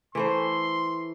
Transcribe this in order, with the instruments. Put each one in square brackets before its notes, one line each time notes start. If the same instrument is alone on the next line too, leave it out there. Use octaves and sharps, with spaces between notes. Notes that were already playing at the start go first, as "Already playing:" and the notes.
[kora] E3 A3 C5 [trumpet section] C6